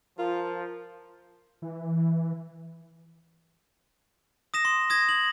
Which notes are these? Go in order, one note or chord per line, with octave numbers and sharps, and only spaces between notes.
F3 F4 A#4
E3
D#6 A#6 E7
C6
D#6 G#6 A#6
F#7